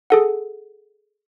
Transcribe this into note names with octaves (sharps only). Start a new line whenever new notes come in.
G#4 A4 F#5